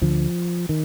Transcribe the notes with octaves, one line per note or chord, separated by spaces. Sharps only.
D2 D3 F3
D#3